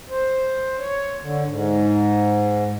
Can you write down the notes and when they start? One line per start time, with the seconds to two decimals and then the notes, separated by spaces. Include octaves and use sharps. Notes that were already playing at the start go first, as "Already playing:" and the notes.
0.10 C5
0.79 C#5
1.21 D3
1.47 G#2